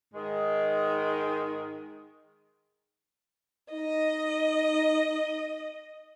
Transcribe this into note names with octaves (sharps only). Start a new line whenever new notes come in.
G#2 D#3 G#3
D#4 D#5